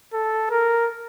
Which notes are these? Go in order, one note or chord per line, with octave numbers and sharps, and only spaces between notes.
A4
A#4